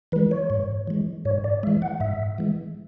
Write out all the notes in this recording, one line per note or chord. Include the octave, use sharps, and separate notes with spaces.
E3 G#3 B4
C#5
G#2
E3 G#3
G#2 C#5
D5
E3 G#3 E5
F#5
G#2 E5
E3 G#3